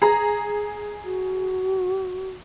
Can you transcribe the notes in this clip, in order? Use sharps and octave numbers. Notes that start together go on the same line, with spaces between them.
G#4 A#5
F#4